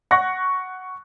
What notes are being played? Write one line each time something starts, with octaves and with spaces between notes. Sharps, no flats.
F#5 C#6 F#6 A#6